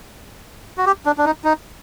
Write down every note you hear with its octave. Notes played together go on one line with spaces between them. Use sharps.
F#4
G4
D4
D4
D#4
D#4